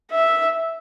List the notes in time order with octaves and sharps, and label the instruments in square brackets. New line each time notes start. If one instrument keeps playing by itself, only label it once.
[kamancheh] E5